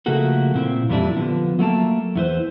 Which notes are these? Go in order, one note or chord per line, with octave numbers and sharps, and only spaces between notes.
C#3 F3 A3 A#3 F#4 A4
A#2 C4 E4
F2 A#2 E3 G3 D4 E4
D3 F3 B3
F#3 A3 A#3 A5
E2 E3 C5